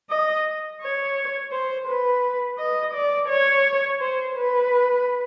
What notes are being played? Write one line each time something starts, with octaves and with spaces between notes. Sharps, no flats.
D#5
C#5
C5
B4
D#5
D5
C#5
C5
B4